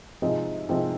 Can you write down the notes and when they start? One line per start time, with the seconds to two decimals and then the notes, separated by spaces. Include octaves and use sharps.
0.22 C3 F3 G#3 C4 D#4
0.69 C3 F3 G#3 C4 D#4